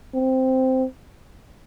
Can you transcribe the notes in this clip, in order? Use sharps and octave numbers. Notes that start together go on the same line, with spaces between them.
C4